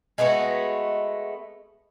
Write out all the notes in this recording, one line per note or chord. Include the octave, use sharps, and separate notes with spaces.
G#3 A3 B3 F#4